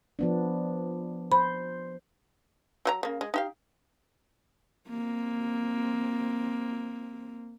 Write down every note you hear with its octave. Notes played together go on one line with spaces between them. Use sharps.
F3 B3 D4
C5 B5
F#3 F#4 A#5
C#3 A#3
G#3
D#4 G4 F5
A#3 C4